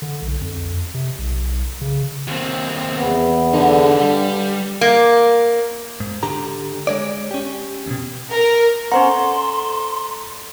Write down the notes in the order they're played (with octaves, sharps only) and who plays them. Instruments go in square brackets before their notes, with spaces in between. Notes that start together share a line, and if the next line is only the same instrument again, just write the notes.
[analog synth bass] D3
B1
F2
C3
B1
C#3
[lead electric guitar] D#2 C4
[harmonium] E2 B3
[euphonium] D3 [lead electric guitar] D#4 A4
[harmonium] G2 [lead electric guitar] G3
[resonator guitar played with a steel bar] A#3
[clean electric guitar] G#2
D3 G4 A#5
G#3 C#5 D5
C#4 G4
D#2 B2
[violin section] A#4
[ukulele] C#4 C5 F#5 [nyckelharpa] A4 D5 [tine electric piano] A#5 [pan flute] C6